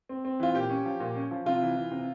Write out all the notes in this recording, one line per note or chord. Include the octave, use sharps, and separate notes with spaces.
C4
C4
E3 F4
A#2 G4
C#4
F3
A#2
C#4
F3
C3 F4
E3
E3
C3